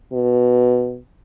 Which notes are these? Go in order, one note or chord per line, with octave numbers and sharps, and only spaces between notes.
B2